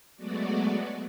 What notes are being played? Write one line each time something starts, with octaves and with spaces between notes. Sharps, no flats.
F#3 G#3 A3 B3 F#4 D5